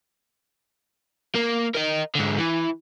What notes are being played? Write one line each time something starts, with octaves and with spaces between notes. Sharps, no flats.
A#3
A#4 D#5
G#2 D3
E3